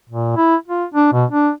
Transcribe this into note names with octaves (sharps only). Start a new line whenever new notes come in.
A#2
E4
F4
D4
B2
D4